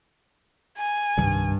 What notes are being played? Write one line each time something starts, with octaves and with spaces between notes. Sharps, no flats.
G#5
C2 G2 D#3 G3